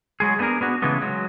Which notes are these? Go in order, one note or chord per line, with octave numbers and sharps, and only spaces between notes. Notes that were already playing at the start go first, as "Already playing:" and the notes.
F#3 G#3 G#4
A3 B3 D4 G#4 A#4
B3 D4 F#4
C#3 E3 G#3 A3 B3
F#3 G#3